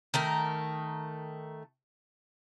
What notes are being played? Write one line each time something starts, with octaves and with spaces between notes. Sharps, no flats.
D#3 A3 A#4